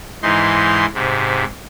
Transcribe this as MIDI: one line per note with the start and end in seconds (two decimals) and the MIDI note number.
0.23 0.86 44
0.23 0.86 52
0.23 0.86 63
0.23 0.86 84
0.94 1.44 44
0.94 1.44 48